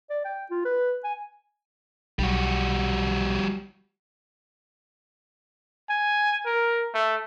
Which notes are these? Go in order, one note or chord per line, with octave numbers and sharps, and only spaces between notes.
D5
G5
F4
B4
G#5
B1 G3 F#4
G#5
A#4
A3